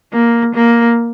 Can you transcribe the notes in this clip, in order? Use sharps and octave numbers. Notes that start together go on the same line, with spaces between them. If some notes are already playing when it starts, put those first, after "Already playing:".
A#3
A#3